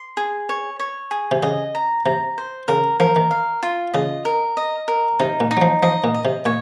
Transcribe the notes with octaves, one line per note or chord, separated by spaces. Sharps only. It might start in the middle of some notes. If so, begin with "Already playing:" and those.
Already playing: C6
G#4
C#5
C#5
G#4
C3
C#3 D#5
A#5
C3 A#5
C5
C#3 A#4
F3 A#4
D#3
F5
F4
C#3 D#5
A#4
D#5
A#4
C3 D#4
A#2
D#4
F#3
F3
F3 D#5
A#2
D#5
C3
A#2 C#5